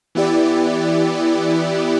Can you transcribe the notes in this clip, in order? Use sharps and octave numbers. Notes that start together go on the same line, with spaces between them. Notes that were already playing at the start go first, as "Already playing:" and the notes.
E3 B3 E4 G4 D5